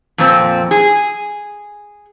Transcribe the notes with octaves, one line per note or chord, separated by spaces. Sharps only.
F2 A#2 C4
G#4